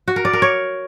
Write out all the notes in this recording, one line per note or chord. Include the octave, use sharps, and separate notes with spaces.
F#4
A#4
D5
A#4
C#5